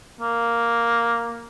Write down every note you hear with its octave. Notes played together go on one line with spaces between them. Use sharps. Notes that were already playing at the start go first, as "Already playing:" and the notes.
A#3